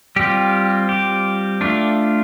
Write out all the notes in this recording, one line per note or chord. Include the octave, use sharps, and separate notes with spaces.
G3 C4 F4 G4
G4
A3 D4 F4